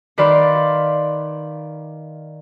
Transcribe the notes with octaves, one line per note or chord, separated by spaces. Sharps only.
D#3 B4 D5 F5 C6